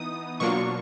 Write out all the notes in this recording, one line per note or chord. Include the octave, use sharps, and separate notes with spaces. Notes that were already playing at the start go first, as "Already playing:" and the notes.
Already playing: E3 B3 D#4 D#6
B2 F#3 A#3 D4 F4 C#6